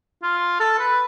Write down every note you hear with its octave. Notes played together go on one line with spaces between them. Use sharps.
F4
A4
B4